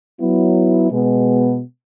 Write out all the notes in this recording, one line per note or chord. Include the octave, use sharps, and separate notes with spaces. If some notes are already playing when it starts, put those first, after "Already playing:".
F#3 B3 E4
B2 G#3 B3